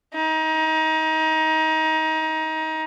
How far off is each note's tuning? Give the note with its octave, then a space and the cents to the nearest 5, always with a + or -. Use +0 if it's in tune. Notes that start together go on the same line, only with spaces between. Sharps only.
D#4 +25